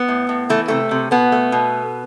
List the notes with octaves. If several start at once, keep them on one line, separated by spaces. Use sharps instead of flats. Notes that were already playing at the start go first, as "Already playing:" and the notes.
Already playing: B3
A2
A2
E3 A3
C3 A3
C3
B2 B3
A3
B2